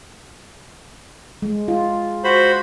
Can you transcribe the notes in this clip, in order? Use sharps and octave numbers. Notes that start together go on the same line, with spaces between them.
G#3
F4
F#4 C5 B5